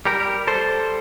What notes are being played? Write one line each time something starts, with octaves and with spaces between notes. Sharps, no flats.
G3 G4 A#4
G3 A4 C5